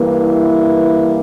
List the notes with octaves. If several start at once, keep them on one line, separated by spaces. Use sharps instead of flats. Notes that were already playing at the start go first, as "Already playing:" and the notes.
Already playing: G2 E3 A#3
E4